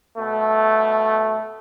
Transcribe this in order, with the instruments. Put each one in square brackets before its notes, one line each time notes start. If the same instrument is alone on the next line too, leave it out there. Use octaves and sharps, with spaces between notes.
[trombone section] B2 A3